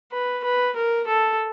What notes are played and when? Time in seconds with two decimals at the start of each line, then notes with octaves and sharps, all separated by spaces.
0.12 B4
0.44 B4
0.76 A#4
1.07 A4